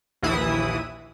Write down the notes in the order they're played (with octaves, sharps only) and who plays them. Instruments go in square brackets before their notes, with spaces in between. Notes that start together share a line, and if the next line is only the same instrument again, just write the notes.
[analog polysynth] A#1 D#2 E3 E4 D#6